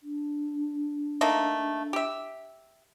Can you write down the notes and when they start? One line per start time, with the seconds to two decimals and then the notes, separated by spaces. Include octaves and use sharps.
0.03 D4
1.21 A3 A#3 D#4
1.93 G4 E5